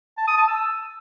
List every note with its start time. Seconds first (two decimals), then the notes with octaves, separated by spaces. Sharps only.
0.17 A5
0.27 D#6
0.37 A5
0.47 E6